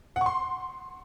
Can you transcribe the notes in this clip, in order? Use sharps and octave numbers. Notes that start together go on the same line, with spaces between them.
F#5
C#6
C6